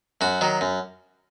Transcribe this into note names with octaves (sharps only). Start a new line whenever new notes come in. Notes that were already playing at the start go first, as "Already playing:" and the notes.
F#2 F#4
D#3 F#3
F#2